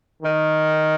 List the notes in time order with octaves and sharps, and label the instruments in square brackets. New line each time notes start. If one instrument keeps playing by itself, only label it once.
[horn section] D#3